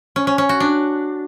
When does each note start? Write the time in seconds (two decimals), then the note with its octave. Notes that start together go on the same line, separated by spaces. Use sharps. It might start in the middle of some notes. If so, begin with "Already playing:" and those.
0.16 C#4
0.27 C#4
0.38 C#4
0.49 F#4
0.60 D4